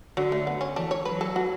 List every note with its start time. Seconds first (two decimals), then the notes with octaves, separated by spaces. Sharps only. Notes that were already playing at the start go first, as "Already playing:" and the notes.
0.17 D3 F#3
0.32 A3
0.47 B3
0.61 C#4
0.76 E3 D4
0.91 C#5
1.05 F#3 B4
1.21 A4
1.36 F#4